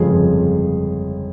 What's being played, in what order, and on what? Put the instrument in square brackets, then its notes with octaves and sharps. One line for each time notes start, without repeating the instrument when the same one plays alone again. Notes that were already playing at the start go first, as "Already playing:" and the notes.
Already playing: [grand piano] G1 F2 C#3 F3 G#3 G#4